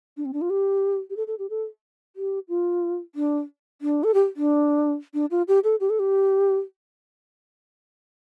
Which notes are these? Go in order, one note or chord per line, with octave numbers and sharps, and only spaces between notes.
D4
C4
D4
F4
G4
G4
A4
A4
G4
A4
G4
F4
D4
D4
A4
G4
D4
D4
F4
G4
A4
G4
A4
G4